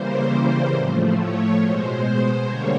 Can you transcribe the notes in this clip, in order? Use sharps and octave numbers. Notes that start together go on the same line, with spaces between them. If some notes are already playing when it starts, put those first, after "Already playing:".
Already playing: C#3 E3 G3 A#3 C5
A2 F3 A3
C#5
B2 G#3 C5
C5
D3 G3 A#3 C#5